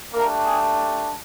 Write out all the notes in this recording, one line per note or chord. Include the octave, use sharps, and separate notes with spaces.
A3 A#3 D4 G4 A#4
G#4